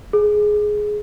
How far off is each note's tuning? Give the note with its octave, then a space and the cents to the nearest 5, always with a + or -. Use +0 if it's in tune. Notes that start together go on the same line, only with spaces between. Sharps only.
G#4 +10